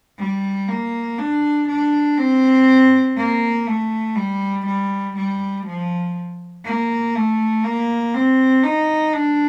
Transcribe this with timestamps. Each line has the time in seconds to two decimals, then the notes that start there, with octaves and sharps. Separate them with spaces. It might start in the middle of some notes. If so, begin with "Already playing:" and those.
0.19 G3
0.69 A#3
1.19 D4
1.68 D4
2.18 C4
3.17 A#3
3.67 A3
4.16 G3
4.66 G3
5.16 G3
5.66 F3
6.65 A#3
7.15 A3
7.64 A#3
8.14 C4
8.64 D#4
9.14 D4